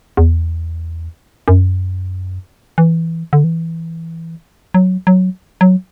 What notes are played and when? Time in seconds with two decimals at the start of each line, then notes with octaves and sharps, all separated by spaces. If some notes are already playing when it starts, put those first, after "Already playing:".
0.17 E2
1.48 F#2
2.78 E3
3.33 D3
3.44 E3
4.74 F#3
5.07 F#3
5.61 F#3